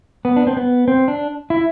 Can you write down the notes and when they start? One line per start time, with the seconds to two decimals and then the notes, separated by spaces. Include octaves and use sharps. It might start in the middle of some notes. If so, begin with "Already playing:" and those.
0.25 B3
0.36 D4
0.47 C4
0.57 B3
0.88 C4
1.08 D4
1.50 E4